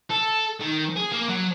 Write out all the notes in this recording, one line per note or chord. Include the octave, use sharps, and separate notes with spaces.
A4
D#3
G#4
A#3
F#3